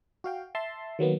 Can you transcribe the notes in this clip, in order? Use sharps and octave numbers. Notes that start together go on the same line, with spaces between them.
F#4 F5 G5
E5 A5 C6
D#3 F#3 A#3 B3